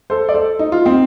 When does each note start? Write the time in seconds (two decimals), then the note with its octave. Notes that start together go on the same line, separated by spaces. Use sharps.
0.10 A4 C5
0.29 D5
0.34 A4 C5
0.59 D#4
0.72 F4
0.86 C4 D#4